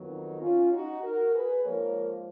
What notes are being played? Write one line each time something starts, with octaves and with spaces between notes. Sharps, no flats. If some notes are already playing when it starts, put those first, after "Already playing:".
Already playing: F2 D#3 F#3 B3
D#4
C#4 F4
D#4 F#4
F#4 A#4
G#4 B4
G#2 F3 A#3 A#4 C#5